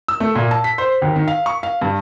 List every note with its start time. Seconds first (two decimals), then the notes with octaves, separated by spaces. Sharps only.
0.08 E6
0.20 A3
0.35 A#2
0.51 A5
0.64 B6
0.78 C5
1.02 D#2
1.16 D#3
1.28 F5
1.46 C#6
1.63 F5
1.82 G2